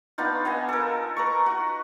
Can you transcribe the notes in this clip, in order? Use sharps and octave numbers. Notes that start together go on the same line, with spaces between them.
B3 D4 D#4 F4
B3 D#5 G#5
A4 A#4
B4 A#5 C#6
F#4